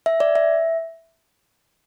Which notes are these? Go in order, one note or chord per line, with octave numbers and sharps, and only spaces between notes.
E5
D5
E5